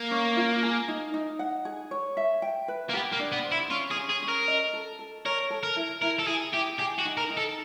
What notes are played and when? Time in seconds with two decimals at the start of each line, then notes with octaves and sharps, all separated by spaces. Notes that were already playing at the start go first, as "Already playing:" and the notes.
Already playing: A#3
0.11 C#4
0.37 F4
0.63 G#4
0.88 D#4
1.14 D#4
1.39 F#5
1.65 G#4
1.91 C#5
2.17 E5
2.42 G5
2.68 B4
2.89 A#3
2.93 B3 G4
3.12 A#3
3.19 D4
3.32 B3
3.45 C5
3.52 E4
3.70 C#4 F4
3.91 G#4
3.96 C#4
4.09 G#4
4.22 C#4
4.28 A#4
4.48 D#5
4.73 A4
4.99 A4
5.25 A#4 C#5
5.50 A4
5.63 A#4
5.76 E4
6.02 E4 A#4
6.19 A4
6.27 E4 G#4
6.53 E4 G4
6.79 G4 G#4
6.98 F#4
7.05 D#4
7.17 A#4
7.30 D#4
7.37 A4